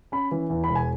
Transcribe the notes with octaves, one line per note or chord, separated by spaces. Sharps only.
C#4 B5
E3
E2
E1 B5
G#5